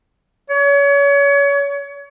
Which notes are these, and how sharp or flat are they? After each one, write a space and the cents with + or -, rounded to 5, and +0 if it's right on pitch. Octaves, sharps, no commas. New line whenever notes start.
C#5 +30